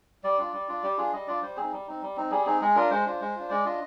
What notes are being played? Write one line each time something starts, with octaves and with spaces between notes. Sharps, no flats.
G3 D5
D4 F4
G3
D4 F4
G3 G4
D4 F4 G#4
G3 D#5
D4 F4 D5
G3 C5
C4 D#4 G#4
G3
C4 D#4
G3
C4 D#4
G3 G#4
C4 D#4 G#4
G#3 G#4
D4 F4 A#4
G#3 C5
D4 F4
G#3
D4 F4
G#3 D5
D4 F4 D#5